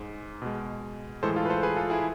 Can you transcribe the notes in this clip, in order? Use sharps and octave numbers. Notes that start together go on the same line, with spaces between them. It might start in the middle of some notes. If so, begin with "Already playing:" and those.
Already playing: G#2 G#3
B2 G#3
A2 E3 G#3 A4 C5
F4 A4
B4
A4 C5
G#4 B4
F4 A4
E4 G#4